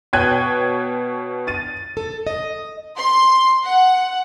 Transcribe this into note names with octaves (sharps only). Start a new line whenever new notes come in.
B2 C#5 G5 F#6 G#6 D#7
A6 D#7
A4
D#5
C6
F#5